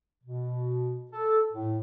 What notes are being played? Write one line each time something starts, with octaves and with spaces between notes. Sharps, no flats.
B2
A4
A2